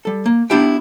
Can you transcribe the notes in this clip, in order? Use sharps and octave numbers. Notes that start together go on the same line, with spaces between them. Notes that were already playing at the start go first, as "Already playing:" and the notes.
G3 A4
A#3
B3 D4 E4 G4 E5 G5